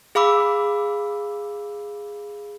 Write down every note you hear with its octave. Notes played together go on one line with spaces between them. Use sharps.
G#4 F5 B5 D6 E6